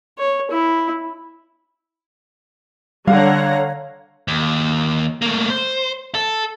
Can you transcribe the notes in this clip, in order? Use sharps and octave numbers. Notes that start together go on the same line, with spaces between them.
C#5
E4
D3 G3 C#5 F5 F#5 A#5
D#2
A3 A#3
C5
A4